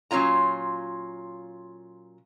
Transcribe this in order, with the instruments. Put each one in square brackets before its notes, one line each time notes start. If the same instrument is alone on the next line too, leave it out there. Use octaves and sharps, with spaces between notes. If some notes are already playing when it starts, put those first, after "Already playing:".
[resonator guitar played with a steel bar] A#2 F#3 C#4 F4 A#5